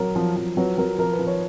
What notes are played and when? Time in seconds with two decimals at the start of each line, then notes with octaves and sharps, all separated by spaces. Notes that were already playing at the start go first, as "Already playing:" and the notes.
Already playing: F#3 A#4
0.16 F3
0.37 F3
0.57 F#3 B4
0.78 F#3 A#4
0.98 F3 A#4
1.13 B4
1.19 F3
1.27 C#5